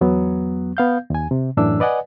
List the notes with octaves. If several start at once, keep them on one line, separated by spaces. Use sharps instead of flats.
E2 F#3 B3
B3 F5 G6
D#2 G#5
C3
F#2 A2 E3 D4 E6
B4 D5 D#5 F#5 G#5